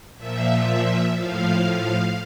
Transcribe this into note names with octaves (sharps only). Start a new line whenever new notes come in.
A#2 F3 E5
A2 F3 F5